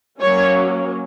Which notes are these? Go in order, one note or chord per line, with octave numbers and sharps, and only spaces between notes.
F#3 A#3 C#4 C#5